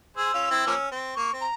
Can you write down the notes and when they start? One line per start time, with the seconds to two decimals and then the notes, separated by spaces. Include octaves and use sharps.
0.17 G#4 C5 E6
0.34 C#4 F4
0.50 C4 E4
0.67 F3 A#3 C#4
0.92 C4
1.15 A#3 C#6
1.33 C4
1.41 A#5